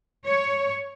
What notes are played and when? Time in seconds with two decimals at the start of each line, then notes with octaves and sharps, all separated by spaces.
0.25 C#5